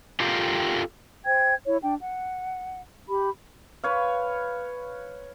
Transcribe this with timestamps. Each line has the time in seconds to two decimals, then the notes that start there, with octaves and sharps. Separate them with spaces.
0.20 F4 G4 A4 A#4 F5 G5
1.25 C5 G5 G#6
1.65 E4 C#5
1.82 D4 G5
2.02 F#5
3.08 G4 B5
3.84 B4 C#5 F5